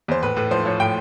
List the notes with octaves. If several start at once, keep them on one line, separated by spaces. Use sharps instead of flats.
E2 C5
A2 B4
A2 B4
F3 C5
F3 C#5
A2 G5